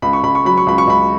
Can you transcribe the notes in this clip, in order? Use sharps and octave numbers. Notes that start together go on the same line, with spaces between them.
C#2 B5
C#6
C#2 B5
C#6
F#3 B5
C#6
C#2 B5
C#6
C#2 B5